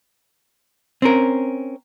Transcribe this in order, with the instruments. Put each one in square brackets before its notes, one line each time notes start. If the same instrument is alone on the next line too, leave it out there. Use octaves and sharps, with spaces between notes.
[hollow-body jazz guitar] C4 C#4 A#4